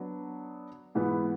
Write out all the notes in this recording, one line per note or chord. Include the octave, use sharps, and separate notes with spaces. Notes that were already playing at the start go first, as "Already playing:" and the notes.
Already playing: F#3 B3 D4
G#2 E3 B3